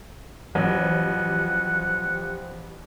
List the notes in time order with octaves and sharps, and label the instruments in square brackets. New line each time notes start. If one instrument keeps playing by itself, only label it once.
[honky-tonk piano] A1 [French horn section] F3 G4 [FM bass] F#3 [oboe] F#5